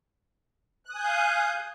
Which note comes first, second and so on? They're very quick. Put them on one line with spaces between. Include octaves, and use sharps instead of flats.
F#6 D#6 G#5 G6 F5